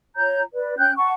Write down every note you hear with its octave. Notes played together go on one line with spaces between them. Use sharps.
F4 C#5 A#5 G6
B4 D5
C#4 G5 F#6 G6
F#5 A5 C#6